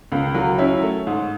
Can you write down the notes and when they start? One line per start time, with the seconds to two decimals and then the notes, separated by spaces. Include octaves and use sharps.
0.12 C#2
0.34 F#3
0.58 C#4 E4 E5
0.83 A3
1.07 G#2